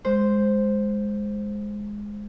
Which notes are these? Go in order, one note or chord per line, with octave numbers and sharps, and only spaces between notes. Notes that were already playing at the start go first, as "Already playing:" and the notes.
G#3 C5